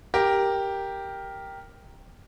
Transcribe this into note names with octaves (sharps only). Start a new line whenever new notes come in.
G4 A#4